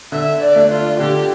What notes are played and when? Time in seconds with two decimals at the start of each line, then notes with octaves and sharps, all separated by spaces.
0.12 D3 E5
0.41 D5
0.56 A3 D4
0.71 F4
0.99 D3 G4